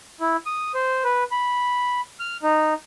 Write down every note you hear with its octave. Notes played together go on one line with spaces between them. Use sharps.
E4
D#6
C5
B4
B5
F6
D#4